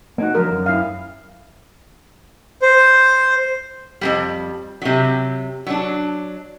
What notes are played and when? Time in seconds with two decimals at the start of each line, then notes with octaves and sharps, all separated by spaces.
0.18 A#3 D#4 F#4
0.35 D3 F3 F#3 A#4
0.51 F#2
0.66 E4 F5
2.62 C5
4.01 F2 C3 G3
4.82 C3 F#3
5.66 F#3 D4